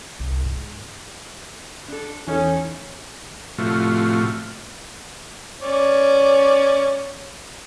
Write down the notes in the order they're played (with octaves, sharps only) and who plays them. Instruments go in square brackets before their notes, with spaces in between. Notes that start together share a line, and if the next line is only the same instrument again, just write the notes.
[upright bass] C2
G#2
[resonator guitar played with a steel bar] D4 A4
[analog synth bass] E2 [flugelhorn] C#4 [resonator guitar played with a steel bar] D#4 A4
[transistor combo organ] A2 C3 F3 A3 F4 F#4
[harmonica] C#4 D5